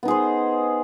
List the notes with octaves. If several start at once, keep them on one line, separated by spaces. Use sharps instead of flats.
B3 D#4 G#4 C5